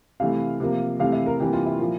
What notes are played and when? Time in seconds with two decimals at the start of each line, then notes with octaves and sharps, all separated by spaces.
0.20 C3 E3 A3 F5
0.60 C3 F3 A#3
1.00 C3 E3 A3 F5
1.12 E5
1.26 A#4
1.39 C3 E3 G3 A#3 G4
1.53 F4
1.66 E4
1.79 A#2 F3 A#3